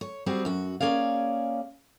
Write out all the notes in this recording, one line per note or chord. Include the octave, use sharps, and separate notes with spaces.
C#5
G3 C4 F#4 G#4
F#2 F#4
A#3 C#4 G#4 D5 F5